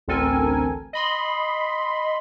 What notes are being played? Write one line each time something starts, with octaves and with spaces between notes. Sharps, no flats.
A1 D2 C4 A4 A#4 G#5
D#5 B5 C6